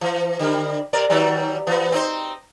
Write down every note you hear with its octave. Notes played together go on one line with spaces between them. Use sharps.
E3
D3 G3
C3 A#4 D5
D#3 F#3 G3
E3 B3
C4 D#4 C5